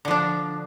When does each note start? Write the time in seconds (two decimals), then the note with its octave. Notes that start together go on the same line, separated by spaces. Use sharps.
0.05 D3
0.08 F3
0.11 D4